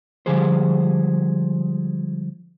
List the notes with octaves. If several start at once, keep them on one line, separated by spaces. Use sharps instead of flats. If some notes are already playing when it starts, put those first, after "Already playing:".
D3 F3 G3 G#3 G#4 C5